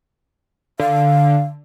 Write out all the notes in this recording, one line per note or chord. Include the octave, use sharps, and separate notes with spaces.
D3 F5